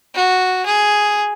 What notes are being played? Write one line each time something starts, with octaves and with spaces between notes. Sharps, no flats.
F#4
G#4